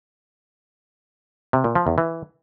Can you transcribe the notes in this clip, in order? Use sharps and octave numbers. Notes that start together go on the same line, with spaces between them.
C3
A#2
F3
E2
E3